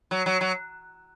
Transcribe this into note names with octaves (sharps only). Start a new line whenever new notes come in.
F#3
F#3
F#3